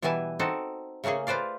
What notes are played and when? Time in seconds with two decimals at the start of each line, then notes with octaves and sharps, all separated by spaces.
0.02 B2 E3 G3 E4 G#5 A5
0.39 C4 D#4 F#4 A4
1.04 C#3 A3 A#3 C#4 G#4
1.27 F4 B4 C5 D5 F5